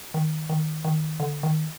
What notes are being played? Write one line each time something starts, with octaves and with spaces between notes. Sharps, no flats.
D#3
D#3
D#3
D3
D#3